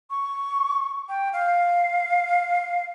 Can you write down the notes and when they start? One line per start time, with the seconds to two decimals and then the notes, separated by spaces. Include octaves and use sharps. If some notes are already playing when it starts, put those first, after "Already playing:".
0.10 C#6
1.09 G5
1.33 F5